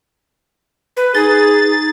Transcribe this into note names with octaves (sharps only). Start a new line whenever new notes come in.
B4
D#4 G#4 A#5 A6